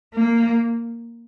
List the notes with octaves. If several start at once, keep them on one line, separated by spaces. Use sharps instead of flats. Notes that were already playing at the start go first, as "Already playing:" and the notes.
A#3